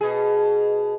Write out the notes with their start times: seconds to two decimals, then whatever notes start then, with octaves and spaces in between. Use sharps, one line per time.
0.01 B2 G#4